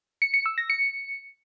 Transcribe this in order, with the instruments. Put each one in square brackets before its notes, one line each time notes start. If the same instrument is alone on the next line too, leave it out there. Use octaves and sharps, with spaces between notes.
[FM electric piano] C#7
C#7
E6
A#6
C#7